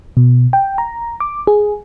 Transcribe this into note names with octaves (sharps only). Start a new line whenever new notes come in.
B2
G5
A#5
D6
G#4